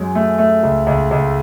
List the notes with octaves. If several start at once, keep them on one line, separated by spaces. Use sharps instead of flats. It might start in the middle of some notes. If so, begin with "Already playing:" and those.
Already playing: F#2 G#3
A3
A3
C#2
C#2
C#2